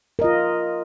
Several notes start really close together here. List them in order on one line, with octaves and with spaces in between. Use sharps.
A#4 D#5 F4